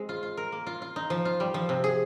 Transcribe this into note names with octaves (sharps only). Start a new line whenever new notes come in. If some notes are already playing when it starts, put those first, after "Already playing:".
Already playing: G#3 C4
F4
F4
A#4
A#3
F4
F4
D#4
F3
F4
G3
F3
C3
G#4